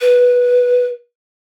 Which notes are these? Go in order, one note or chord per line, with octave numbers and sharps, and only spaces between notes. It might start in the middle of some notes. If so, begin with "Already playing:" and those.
B4